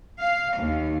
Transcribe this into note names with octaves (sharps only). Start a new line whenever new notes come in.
F5
D#2